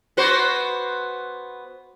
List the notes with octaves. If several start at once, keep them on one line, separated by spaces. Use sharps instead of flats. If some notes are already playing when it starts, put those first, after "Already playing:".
B3 F#4 C5